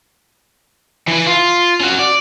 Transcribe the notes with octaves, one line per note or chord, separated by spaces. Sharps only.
E3 B4
F4
C#4 F#4
D5